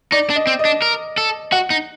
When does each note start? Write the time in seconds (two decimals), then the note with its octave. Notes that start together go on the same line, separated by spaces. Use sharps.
0.12 D#4 D5
0.30 D4
0.36 D#5
0.47 C4
0.59 D#5
0.65 D4
0.82 A#4
1.18 A4
1.52 F#4 F#5
1.70 D#4